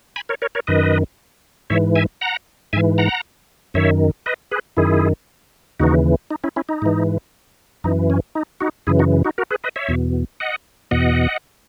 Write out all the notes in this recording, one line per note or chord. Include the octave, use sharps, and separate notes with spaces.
G#5 B5
A#4 C#5
A#4 C#5
A#4 C#5
F#2 D#3 B4 D#5
G#2 E3 C#5 E5
E5 G#5
F#5 A#5
G#2 E3 E5 G#5
F#5 A#5
F#2 D#3 C#5 E5
B4 D#5
G#4 B4
F#2 D#3 E4 G#4
D#2 C#3 E3 D#4 F#4
D#4
C#4 E4
C#4 E4
D#4
G#2 E3
F#2 E3 D#4
C#4
D#4
D#4 F#4
F#2 C#3 E3 E4 G#4
D#4 F#4
D#4 F#4
F#4 A#4
G#4 B4
B4 D#5
C#5 E5
E2 B2
D#5 F#5
E2 B2 D#5 F#5